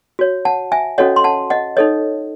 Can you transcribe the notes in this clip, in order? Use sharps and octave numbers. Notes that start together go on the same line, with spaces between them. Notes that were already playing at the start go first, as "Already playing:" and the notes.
F#4 C#5
F#5 A5
E5 G#5
C#4 F#4 A4 C#5 D#5 F#5
C6
F#5 A5
D#5 F#5
D#4 A4 C#5 D#5